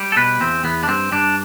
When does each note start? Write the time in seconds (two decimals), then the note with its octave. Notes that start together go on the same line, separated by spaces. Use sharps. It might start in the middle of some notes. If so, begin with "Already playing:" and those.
Already playing: G3
0.12 A4
0.16 B2 B4
0.40 E2 C4
0.64 E2 B3
0.83 D4
0.88 G2 C4
1.12 G2 D4